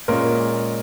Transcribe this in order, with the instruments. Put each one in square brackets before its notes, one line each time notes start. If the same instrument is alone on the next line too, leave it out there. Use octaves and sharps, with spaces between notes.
[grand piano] A#2 G#3 C#4 A#4